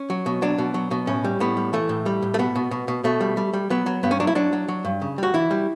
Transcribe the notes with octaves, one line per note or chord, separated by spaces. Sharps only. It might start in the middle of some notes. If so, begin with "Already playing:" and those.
Already playing: C#4
F#3
B2
F#3 D4
B2
F#3
B2
A2 C#4
G3
A2 B3
G3
E3 A3
A2
G3
A2
A3
B2 B3
B2
B2
B2
B2 A3
G3
G3
G3
F#3 B3
F#3
G2 B3
C#4
F#3 D4
E4
F#3 D4
F#3
F#3
G2
C#3
G3 F#4
E3 E4
G3